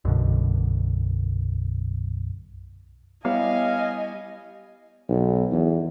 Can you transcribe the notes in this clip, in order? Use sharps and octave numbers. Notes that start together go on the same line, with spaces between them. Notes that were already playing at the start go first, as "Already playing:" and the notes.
B1 F#2 B2 D3
G3 B3 E4 C#5 D#5 F5 G#5
B1
E2